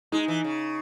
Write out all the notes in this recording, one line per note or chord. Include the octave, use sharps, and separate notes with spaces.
G#3 D#4
E3
C#3